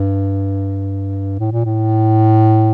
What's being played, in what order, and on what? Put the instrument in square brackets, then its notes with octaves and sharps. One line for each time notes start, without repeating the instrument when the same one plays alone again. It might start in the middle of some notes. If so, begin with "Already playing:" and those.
Already playing: [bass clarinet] G2
A2
A#2
A2